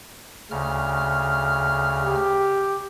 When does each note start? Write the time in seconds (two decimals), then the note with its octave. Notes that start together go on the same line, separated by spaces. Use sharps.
0.51 D2 C#3 F6
2.02 G4